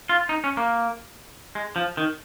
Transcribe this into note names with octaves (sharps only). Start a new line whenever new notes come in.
F4
D#4
C#4
A#3
G#3
F3
D#3